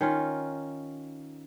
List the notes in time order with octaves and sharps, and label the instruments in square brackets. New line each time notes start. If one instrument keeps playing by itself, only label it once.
[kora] D#3 C#4 F4